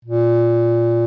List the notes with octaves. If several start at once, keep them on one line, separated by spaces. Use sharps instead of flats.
A#2